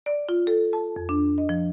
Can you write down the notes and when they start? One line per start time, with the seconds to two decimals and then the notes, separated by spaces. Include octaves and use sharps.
0.06 D5
0.29 F4
0.47 A4
0.73 A5
0.96 F2
1.09 D4
1.38 D#5
1.49 F3